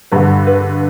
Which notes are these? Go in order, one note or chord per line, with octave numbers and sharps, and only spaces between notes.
G2 D3 B4
B4